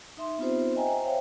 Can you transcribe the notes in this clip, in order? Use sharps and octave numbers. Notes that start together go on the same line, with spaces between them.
D#4 E5 C6
B3 C4 D#4 F4 G4 C5
C5 D#5 E5 G5 G#5 A#5
C5
C5 C#5 E5 F5 G5